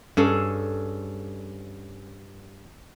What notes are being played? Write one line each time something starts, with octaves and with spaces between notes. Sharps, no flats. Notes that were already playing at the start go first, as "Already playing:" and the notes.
G2 C#4 G#4 A4